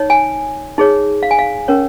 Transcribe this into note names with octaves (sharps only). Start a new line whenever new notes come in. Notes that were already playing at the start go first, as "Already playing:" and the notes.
Already playing: D#4 C#5
G#5
D#4 G#4 C#5
F5
G#5
F5
C#4 A#4 C#5